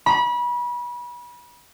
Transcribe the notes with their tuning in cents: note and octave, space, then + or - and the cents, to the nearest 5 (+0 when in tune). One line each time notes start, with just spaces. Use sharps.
B5 -30